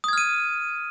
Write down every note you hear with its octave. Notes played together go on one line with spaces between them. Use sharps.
D#6 F6 G#6 D#7